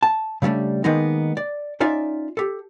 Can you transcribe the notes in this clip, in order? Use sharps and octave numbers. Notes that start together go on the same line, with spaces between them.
A5
C#3 F#3 G3 A3 D4
D#3 G#3 A#3 B3 D#4
D5
C#4 D#4 F4 D5 E5
G4 A4